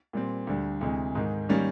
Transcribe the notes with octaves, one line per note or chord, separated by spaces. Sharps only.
A#2 G3 C4
D2 D3 G3
D2 C3 E3 G#3
G#2 D#3 G#3
D#3 G3 A#3 C#4